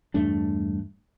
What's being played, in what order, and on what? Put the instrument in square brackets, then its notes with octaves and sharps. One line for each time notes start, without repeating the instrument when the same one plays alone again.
[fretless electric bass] E2 G2 A3 D4